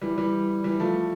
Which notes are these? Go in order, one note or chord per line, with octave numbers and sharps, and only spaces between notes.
E3 G3
E3 G3
E3 G3
F3 A3